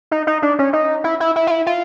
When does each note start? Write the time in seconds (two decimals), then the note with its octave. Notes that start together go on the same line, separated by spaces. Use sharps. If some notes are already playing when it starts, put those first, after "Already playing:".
0.11 D#4
0.27 D#4
0.42 D4
0.59 C#4
0.73 D#4
1.04 E4
1.20 E4
1.36 E4
1.47 F4
1.51 E4
1.66 F4